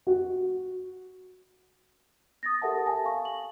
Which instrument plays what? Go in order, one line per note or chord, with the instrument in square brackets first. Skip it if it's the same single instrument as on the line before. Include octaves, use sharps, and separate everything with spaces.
[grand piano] F#4
[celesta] D#6 A6 A#6
G4 A4 A#4 E5 F#5 A5
G#5 A5
F5 C#6
F#7